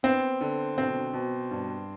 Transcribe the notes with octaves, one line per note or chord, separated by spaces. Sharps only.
B3 C4
D3
B2 C4
B2
G2